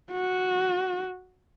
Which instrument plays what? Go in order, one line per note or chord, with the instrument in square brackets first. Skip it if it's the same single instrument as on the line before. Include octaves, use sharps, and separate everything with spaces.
[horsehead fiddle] F#4